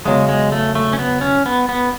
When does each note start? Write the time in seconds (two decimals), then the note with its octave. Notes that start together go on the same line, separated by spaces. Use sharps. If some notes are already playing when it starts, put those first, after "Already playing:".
0.05 E2 C#3 F#3 G#3
0.29 G#3
0.52 A3
0.75 A3
0.93 C#4
0.99 B3
1.21 C#4
1.46 B3
1.69 B3